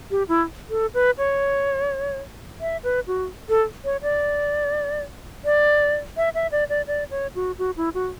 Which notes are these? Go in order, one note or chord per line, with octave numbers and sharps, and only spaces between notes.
G4
E4
A4
B4
C#5
E5
B4
F#4
A4
C#5
D5
D5
E5
E5
D5
D5
D5
C#5
F#4
F#4
E4
F#4